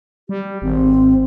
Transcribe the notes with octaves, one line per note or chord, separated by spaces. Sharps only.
G3 G4
G#1 C4